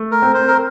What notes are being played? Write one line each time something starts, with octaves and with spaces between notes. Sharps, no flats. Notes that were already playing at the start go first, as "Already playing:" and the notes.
Already playing: A3
A#4
C4
C5
A#4